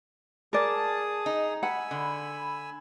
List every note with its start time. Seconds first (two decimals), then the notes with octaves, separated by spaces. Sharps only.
0.53 G#4 A#4 D5 A5 D#6
1.26 D#4
1.63 F#5 G#5 B5 E6
1.91 D3